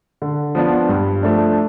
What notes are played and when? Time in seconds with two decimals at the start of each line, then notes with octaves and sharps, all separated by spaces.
0.22 D3
0.55 F3 B3 D4 F4
0.89 G2
1.23 F3 A3 D4